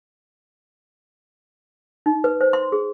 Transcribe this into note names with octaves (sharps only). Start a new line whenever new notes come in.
D#4
B4
C5
C6
G#4